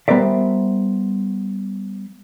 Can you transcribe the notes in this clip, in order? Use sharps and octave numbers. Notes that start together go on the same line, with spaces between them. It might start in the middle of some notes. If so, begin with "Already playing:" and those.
G3 B3 A#4 C5 D5 E5